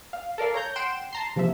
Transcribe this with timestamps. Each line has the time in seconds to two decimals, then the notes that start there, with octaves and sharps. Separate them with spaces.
0.13 F5
0.38 A4 A#4 D5 F5
0.54 C#5 A#5 G6
0.76 F#5 G5 C6 D7 E7
1.13 A5 A#5 C6
1.36 C3 F3 A#3 E5